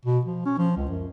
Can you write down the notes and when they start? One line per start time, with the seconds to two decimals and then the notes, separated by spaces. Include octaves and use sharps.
0.05 B2
0.25 F3
0.46 C#4
0.58 F3
0.76 C#2
0.89 F#2